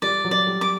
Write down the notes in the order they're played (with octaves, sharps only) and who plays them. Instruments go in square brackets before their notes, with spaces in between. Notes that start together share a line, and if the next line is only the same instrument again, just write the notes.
[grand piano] G3 [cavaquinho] D5
[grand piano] F#3
[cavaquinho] D5
[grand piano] G3
[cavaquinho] D6